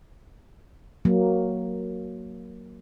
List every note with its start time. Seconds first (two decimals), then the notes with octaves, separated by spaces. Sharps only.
1.05 F#3 A#3